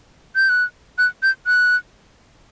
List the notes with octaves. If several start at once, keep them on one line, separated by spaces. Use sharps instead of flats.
G6
F#6
F#6
G6
F#6